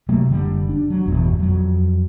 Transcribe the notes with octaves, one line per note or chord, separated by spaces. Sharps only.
C3 F#3 A3 A#3
F#1 D3 G3
D4
F#3
G1 E2 B2
F2 F#3